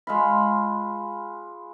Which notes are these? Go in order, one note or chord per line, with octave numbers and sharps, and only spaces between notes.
G#3 F4 B5